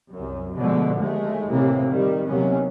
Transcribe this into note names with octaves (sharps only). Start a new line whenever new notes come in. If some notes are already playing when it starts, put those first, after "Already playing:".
C2 F#2
B2 D3 F3 G#3 A3 B3
D#2 G#3 A3
D#2 A2 C3 E3 A#3
D#3 G3
D#2 C3 D#3 F#3 B3 C#4